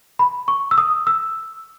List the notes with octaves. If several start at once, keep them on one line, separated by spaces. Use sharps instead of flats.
B5
C#6
E6
D#6
E6